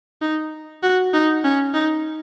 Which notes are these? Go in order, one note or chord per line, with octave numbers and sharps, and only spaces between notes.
D#4
F#4
D#4
C#4
D#4